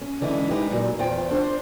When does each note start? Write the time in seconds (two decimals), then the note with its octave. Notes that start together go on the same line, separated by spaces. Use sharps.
0.01 C#4
0.21 D3 E3 G#3 C#4 E4
0.51 G#3 D#4 G4 B4
0.71 A#2 F#3
0.99 E2 F4 C5 G5
1.31 D4 C5